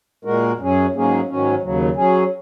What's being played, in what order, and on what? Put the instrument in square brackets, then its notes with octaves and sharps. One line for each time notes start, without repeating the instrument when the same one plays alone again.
[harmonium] A#2 G#3 F#4 A#4
F#2 F#3 C#4 G#4
G#2 F#3 A#3 C#4 G#4
G#2 D#3 F#3 C#4
D#2 C#3 F#3
F#3 C#4 G#4